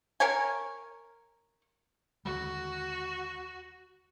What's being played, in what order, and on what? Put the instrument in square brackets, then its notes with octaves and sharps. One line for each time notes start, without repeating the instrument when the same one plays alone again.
[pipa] A#4 C#5 G#5
[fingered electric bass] D#2 D3 G#3 [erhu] F#4